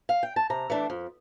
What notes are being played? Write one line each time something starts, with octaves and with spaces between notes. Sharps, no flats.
F5
G5
A5
C3 A#5
E3 A3 D4
F2